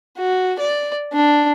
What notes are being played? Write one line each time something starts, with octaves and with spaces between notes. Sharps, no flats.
F#4
D5
D4